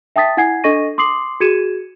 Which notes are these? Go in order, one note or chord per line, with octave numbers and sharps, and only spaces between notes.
E5 G5 A5 D#6 A6 B6
E4 F#5 G#5 G#6 C7
D4 A4 D#5 C#6 A#6 D#7
C6 D6 D#6 C7 F#7
F#4 G#4 G#6 C#7 D#7 E7